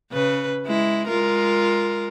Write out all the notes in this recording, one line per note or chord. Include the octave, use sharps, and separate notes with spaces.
C#3 B4
G#3 E4
G#3 F4 A#4